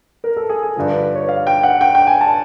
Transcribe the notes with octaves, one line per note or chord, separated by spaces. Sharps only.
A#4
A4
G#4
G#4
G2 D3 F3
B4
B4
C#5
F5
G5
F#5
G5
G5
G#5
A5